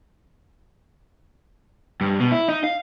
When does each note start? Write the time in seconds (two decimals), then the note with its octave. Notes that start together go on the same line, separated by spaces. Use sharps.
2.01 G2
2.20 B2
2.32 E4
2.49 D#4
2.64 F5